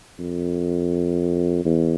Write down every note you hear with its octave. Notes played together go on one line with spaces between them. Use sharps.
F2
E2